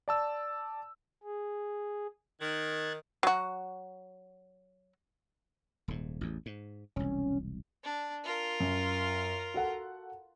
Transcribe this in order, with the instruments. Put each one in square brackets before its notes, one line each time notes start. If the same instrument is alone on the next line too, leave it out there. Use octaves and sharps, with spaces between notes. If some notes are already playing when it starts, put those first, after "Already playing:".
[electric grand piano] D5 A5 E6
[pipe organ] G#4
[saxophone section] D#3 [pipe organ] F#6 G#6 A6
[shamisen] F#3 F#4
[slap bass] D#1 G#2
A1 E2
G#2
[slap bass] E1 C2 [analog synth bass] C#4
[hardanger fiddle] D4
F4 A#4
[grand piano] F#2
F#4 A4 F#5